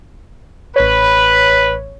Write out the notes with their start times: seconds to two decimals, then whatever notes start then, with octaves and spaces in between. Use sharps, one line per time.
0.76 A1 B4 C#5